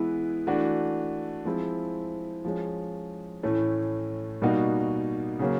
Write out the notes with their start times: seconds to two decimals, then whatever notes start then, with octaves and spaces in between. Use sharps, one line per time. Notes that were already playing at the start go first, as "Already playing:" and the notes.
Already playing: E3 G#3 B3 E4
0.47 E3 A3 D4 F#4
1.45 F3 G#3 C4 E4
2.45 F3 G#3 C#4
3.43 A2 E3 A3 C#4
4.42 B2 G3 A#3 D#4 F#4
5.39 C#3 F#3 A#3